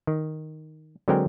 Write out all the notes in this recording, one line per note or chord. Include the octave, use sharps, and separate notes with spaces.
D#3
D3 F#3 G#3 C4 A#4 G5